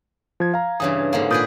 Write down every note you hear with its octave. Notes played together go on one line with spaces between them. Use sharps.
F3 G#6
F5 A#5
G2 C#3 E3 D#6
G#2 D3 A#3
A#2 G#4 B4 D5 D#6 G6